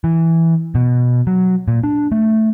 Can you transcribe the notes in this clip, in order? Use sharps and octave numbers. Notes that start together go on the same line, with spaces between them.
E3
B2
F#3
A#2
D4
A3